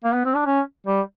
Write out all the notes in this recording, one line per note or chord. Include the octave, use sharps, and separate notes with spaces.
A#3
B3
C4
D4
C#4
G3